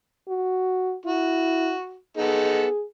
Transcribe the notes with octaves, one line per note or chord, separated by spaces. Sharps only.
F#4
E4 F#4
B3 D#4 G#4 A4